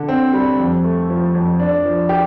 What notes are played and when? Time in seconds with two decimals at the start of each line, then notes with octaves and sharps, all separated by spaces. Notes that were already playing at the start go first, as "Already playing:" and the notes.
Already playing: D3 A4
0.09 C4
0.34 G3
0.60 F2
0.84 A3
1.10 F3
1.35 F2
1.60 D4
1.85 F3
2.09 G4